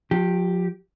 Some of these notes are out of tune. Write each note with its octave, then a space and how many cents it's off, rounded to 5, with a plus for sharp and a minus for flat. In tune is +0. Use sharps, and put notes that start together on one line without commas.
F3 +40 G4 +0